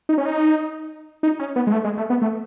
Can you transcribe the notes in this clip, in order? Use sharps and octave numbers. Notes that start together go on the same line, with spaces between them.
D#4
C#4
D#4
D#4
C#4
B3
G#3
A3
G#3
A3
B3
A3